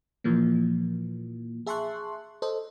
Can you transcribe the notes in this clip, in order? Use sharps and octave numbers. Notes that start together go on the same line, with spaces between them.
A#2 E3 F3 A#3
G#4 E5 A5 C6 C#6 F#6
A4 C5 D#5